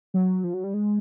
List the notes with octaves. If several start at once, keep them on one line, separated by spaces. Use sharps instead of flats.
F#3
F3
F#3
G3
G#3